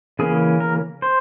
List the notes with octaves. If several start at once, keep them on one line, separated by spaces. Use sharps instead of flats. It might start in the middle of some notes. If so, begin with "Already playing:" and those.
C#3 E3 A#3 C#4 G#4
A#4
C5